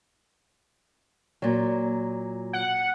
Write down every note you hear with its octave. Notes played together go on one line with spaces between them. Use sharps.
A#2 F#3
F#5